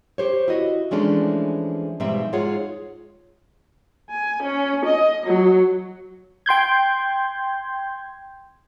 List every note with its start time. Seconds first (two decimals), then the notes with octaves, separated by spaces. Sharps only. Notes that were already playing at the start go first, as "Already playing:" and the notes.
0.18 G4 C5 C#5
0.48 E4 F#4 D#5
0.91 E3 F3 G#3 A3 C#4 D4
2.00 G#2 B2 F3 G3 C4 E5
2.33 G#2 F4 G#4 C#5 F#5
4.10 G#5
4.43 C#4
4.86 D#5
5.27 F#3
6.46 G5 C6 G6 G#6